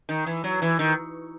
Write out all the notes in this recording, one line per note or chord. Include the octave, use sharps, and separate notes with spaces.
D#3
E3
F#3
E3
D#3